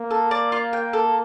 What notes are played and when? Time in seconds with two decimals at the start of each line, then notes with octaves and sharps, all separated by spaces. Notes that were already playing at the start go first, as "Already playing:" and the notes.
Already playing: A#3
0.11 A4
0.31 D5
0.52 F4
0.73 G5
0.93 A4